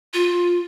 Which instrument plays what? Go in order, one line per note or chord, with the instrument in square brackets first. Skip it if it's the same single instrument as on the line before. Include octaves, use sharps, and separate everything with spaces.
[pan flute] F4